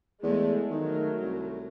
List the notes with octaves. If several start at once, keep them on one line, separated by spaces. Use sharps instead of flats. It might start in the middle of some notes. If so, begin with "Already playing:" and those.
E2 G#3 A3
D#3 F#3 A3 A#4
C2